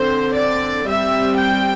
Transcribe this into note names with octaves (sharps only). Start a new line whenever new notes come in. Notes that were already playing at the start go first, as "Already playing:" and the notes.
Already playing: D3 C4 C5
D5
G3 C4 E5
G5